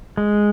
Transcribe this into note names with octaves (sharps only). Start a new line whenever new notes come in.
G#3